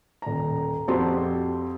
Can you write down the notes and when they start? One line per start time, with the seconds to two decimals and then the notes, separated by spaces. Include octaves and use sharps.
0.22 D#1 A#5
0.88 F2 C4 F#4 G4 A5 C6